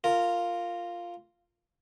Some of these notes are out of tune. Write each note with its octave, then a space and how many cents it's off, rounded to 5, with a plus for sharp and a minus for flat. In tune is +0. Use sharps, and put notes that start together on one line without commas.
F4 +0 A#4 -15